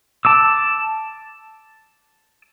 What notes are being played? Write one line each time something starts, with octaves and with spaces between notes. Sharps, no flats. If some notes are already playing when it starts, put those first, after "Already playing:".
A5 D6 E6